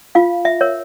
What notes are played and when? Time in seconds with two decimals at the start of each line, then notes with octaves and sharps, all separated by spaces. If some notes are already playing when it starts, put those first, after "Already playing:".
0.15 F4 F5
0.45 E5
0.61 A#4 C#5